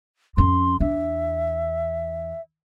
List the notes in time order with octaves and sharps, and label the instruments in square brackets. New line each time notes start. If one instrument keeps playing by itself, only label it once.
[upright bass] F2 C#4 [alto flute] C6
[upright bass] E2 D4 [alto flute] E5